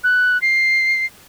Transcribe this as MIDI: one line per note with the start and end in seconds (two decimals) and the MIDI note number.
0.04 0.40 90
0.42 1.06 96